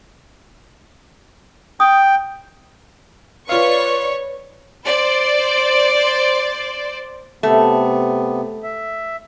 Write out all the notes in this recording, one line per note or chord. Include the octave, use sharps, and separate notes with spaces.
G5 D#6
F4 B4 C#5 D5 F5 C#6
C5 D5
C3 A3 B3
E5